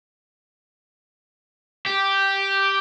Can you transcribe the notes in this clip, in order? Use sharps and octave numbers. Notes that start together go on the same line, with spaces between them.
G4